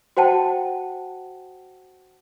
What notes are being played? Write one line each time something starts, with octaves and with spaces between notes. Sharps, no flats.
F#4 C5 F#5 G5 A5